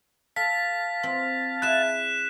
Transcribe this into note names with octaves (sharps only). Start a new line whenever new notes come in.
A4 F5 A5 B6
C4 F4
E4 G#4 F#6 E7